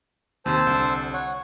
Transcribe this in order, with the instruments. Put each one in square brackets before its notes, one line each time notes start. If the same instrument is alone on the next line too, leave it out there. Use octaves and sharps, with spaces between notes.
[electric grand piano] D#2 C3 [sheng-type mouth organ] C5 A5 E6
[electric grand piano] C2 D3
[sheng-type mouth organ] C#5 F#5